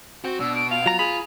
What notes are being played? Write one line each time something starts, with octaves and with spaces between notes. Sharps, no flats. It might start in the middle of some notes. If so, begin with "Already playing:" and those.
C4 F#4
B2 D4 E6
D7
F5 F7
F#3 F4 A#5
G#4 B5